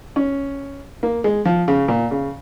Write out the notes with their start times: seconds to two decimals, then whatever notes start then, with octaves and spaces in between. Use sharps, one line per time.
0.16 C#4
1.03 A#3
1.24 G#3
1.45 F3
1.68 C#3
1.88 A#2
2.11 C#3